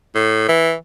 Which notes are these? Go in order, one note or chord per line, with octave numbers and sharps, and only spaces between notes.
A2
E3